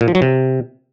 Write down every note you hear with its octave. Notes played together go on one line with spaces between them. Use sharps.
A#2
F3
F#3
C3